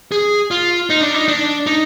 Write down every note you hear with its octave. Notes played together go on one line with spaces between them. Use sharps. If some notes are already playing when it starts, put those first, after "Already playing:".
G#4
F4
D#4
D4
D#4
D4
D#4